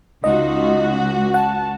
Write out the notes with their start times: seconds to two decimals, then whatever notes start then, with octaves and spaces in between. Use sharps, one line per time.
0.24 C#2 D#4 F4 F#4 D#5
1.34 F#5 A5